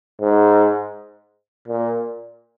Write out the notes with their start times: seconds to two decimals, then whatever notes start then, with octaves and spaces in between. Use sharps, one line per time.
0.21 G#2
1.68 A#2